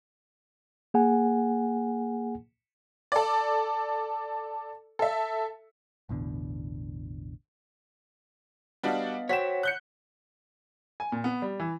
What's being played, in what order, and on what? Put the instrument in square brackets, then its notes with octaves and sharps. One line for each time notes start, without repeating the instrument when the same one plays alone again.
[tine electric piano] A#3 G#4 F#5 G#5
[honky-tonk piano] A4 D5
A4 E5
[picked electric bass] A1 E2 B2 D3
[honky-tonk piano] G3 D4 F#4 [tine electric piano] B3 D#5 F5
[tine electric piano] F#4 C5 G5 [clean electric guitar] C#5 F#5 [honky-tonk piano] B6 E7
[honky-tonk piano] F#6 G6 C#7
[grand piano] G#5
A#2
B3
G3
E3